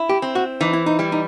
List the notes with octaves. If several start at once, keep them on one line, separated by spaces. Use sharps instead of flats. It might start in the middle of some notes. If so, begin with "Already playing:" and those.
Already playing: E4
G4
C4
F#4
E3 D#4
E4
D#4
G3 E4
D#4